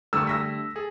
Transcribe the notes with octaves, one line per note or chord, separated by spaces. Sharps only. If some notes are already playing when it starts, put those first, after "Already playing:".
D3 G3 A3 C#6 E6
E6 A#6 B6
G#4 A4